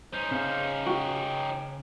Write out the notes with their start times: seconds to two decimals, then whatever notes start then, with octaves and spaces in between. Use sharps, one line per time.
0.13 C#4 D#4 C5
0.31 C#3 F5
0.87 F#4 G5